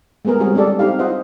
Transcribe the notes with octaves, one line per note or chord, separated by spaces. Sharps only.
G#3 A3 B3 G#4 A#4
G3 G#3 C4 F#4 G#4
G#3 D4 G4 A4 D5
C4 D#4 G4 F5
F4 G#4 C5 D#5 E5 F#5